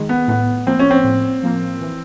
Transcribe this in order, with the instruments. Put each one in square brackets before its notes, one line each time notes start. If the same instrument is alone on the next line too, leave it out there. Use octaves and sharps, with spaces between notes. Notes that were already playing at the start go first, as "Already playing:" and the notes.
Already playing: [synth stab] D#3 G#3
[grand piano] B3
[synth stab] A2 [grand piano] B3
[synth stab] F3 A#3 [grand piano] C4
[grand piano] C#4
C4
[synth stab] A2
F3 A#3
E3